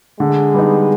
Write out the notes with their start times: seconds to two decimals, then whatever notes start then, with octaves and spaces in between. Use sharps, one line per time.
0.20 D3 G#3
0.54 G3 B3 D#4